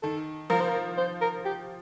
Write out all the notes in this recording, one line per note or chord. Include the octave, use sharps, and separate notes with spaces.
D#3 A4
F3 A#4
C5
A#4
C5
A#4
G4